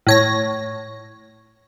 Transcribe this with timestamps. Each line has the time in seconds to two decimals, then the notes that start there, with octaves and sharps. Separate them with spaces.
0.07 A2 C#5 A#6